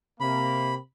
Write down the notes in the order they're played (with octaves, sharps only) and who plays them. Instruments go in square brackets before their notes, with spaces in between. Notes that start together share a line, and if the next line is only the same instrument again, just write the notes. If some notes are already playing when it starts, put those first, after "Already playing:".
[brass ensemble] C3 A#3 [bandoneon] B5